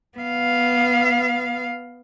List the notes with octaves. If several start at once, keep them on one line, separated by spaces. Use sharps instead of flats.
B3 F5